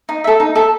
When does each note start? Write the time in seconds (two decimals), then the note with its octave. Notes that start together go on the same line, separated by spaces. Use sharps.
0.09 D#4
0.24 A4 E5
0.40 D#4
0.55 A4 E5